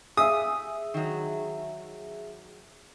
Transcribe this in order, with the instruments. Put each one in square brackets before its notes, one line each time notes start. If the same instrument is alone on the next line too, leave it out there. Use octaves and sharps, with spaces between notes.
[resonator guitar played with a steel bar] G4 F5 G#5 [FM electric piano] G#4 E5 [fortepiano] D#6
[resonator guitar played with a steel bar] D#3 F#3